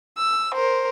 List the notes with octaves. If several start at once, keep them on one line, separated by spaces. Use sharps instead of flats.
E6
A#4 C5